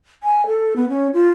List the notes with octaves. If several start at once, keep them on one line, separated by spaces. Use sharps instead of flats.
G#5
A4
B3
C#4
F4